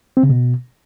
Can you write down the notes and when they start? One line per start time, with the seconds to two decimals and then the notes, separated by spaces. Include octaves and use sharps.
0.17 C4
0.23 C#3
0.29 B2